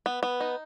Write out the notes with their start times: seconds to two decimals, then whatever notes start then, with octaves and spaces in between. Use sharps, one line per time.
0.06 B3
0.23 B3
0.40 D#4